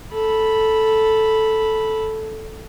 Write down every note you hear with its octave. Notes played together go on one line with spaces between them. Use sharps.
A4 B5